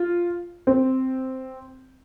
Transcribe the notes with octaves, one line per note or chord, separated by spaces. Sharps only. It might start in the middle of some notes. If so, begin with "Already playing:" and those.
Already playing: F4
C4